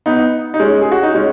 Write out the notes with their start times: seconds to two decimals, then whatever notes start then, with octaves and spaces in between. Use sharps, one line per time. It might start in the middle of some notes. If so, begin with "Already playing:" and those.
0.06 B3 D#4
0.54 D#4
0.60 G#3 C#4
0.81 G#4
0.92 F#4
1.03 D#4
1.14 G#3 C#4